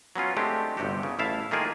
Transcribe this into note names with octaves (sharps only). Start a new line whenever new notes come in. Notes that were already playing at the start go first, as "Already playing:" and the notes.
F#3 B3 C#4 F4
G#3 A3 B3 C4 D4 G4
G1 G2 C3 F#4 G4
C#3
A1 E4 E5 F5 A5
D#3 A3 A#3 F4 G#4 A#4